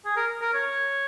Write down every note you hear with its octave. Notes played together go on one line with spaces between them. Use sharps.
G#4
A#4
A#4
C#5